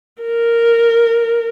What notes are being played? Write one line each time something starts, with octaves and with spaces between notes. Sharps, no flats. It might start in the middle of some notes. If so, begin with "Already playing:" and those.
A#4